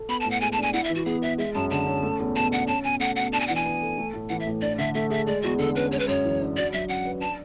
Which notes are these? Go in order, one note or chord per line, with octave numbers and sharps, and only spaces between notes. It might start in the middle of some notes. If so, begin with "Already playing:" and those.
Already playing: A4
B3 B5
A5
A2
F#5
G#3 G#5
A5
D4 G#5
E4 F#5
E5
E3
F#4
B3 G#4
B4 E5
G#3 E5
F#2 A5
D3 A5
C#4
A3
E2
B2 A5
D4 F#5
C#4 A5
B2 G#5
A3 F#5
B2 F#5
D4 A5
G#5
E3 F#5
G#5
B3
A4
A3
A2
E3 F#5
E5
A2
D4 D5
D3 E5
A3 E5
G#4 E5
G#3 D5
E2 F#4
D3 A4
C#4 B4
G#3 C#5
B4
F#2 C#5
E3
D4
F#4 D5
F#3 E5
C#4 F#5
B4
D4 A5